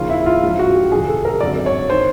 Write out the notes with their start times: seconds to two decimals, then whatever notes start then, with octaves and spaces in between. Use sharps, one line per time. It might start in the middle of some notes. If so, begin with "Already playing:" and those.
Already playing: D#2 C#3 F3 F4
0.10 E4
0.26 F4
0.42 A#1 G#2 F3 F4
0.59 F#4
0.75 G4
0.91 E1 D2 D3 F3 G#4
1.08 A4
1.25 A#4
1.41 G#1 F#2 D3 F#3 D5
1.66 C#5
1.90 D#3 C5